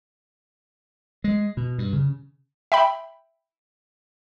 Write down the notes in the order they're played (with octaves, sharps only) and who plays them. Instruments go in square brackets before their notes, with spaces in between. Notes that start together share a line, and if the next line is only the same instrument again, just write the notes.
[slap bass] G#3
B2
G2
C#3
[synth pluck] E5 G5 B5